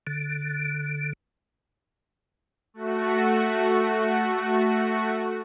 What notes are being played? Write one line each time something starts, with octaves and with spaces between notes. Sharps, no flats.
D3
A3 F#4